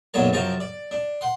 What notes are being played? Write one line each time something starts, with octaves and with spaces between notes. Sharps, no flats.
B1 F#2 A#2 F#3 C#5 A5
F#2 C3 F3 A5 A#5 C#6
D5
D4
F#5 C6